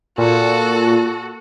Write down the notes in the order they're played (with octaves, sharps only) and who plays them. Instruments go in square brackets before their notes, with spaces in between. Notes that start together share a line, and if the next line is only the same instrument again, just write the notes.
[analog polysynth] A#2 [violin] F#4 A4